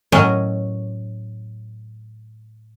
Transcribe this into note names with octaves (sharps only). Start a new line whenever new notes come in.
A2 F#3 C#4 A#4 D#5